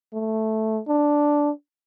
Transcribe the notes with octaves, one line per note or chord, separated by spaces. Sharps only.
A3
D4